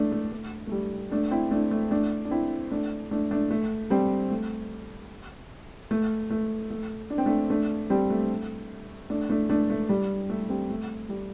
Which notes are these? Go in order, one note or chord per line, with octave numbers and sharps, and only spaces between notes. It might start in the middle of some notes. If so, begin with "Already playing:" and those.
Already playing: A3 D4
A3
A3
A3
G3
A3 D4
C4 E4
A3 D4
A3
A3 D4
D4
C4 E4
A3 D4
A3 D4
A3 D4
A3
G3 C4
A3
A3
A3
A3
D4
C4
A3 D4
A3 D4
G3 C4
A3
A3 D4
A3 D4
A3 D4
A3
G3
A3
G3 C4
A3
G3